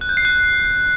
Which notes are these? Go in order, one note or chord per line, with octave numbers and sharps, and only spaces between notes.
F#6
G6
C7
F#6